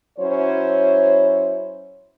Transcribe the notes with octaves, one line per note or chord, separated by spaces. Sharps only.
F#3 C#4 E4 C5 C#5